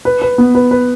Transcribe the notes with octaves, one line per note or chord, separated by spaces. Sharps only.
B4
B4
B3
B4
B4